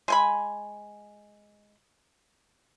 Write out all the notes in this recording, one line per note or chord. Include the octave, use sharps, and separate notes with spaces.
G#3 G#5 B5